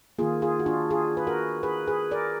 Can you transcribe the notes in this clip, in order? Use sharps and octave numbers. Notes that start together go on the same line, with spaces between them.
D#3 A#3 F4 G#4
F4 G#4
F#4
D4 F4
F4 G#4
B4
F#4 A#4
G#4 B4
G#4 B4
A#4 D5